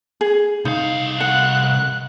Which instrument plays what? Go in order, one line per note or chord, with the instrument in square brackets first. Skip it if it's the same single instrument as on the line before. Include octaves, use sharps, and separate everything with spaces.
[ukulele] G#4
[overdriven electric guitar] C2 F5 [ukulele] D#4
[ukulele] F#5 [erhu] F#6